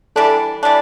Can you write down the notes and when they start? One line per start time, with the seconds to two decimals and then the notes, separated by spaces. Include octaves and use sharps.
0.16 E3 G3 D4 A4
0.63 E3 G3 D4